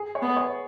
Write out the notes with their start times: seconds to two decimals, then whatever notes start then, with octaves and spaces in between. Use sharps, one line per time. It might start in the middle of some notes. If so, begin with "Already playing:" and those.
Already playing: G#4
0.15 C#5
0.22 B3
0.37 C#5